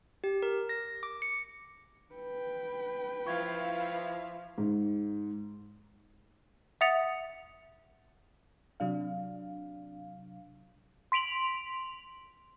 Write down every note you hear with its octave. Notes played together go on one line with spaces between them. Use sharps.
G4
A#4
A#6
D6
C#7
B4 G5
F3 E4 E5 F5 C#6 G#6
G#2
E5 F#5 D#6 A6 C#7 F7
C3 F#3 D4 F5
C6 B6 D7 F7 F#7